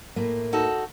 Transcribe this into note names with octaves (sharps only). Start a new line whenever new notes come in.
A2 A3 A#3
D#4 F#4 A4